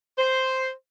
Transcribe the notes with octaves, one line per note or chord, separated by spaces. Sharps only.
C5